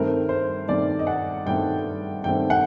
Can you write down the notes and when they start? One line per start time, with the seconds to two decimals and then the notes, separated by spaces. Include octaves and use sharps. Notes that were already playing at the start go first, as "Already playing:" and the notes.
Already playing: G2 D#3 A3 C4 A#4
0.29 C5
0.68 G2 D#3 A3 C4 D5
0.99 D#5
1.07 F#5
1.46 G2 D#3 A3 C4 G5
2.24 G2 D#3 A3 C4 G5
2.50 F#5